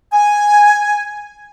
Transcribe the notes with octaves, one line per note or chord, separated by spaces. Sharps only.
G#5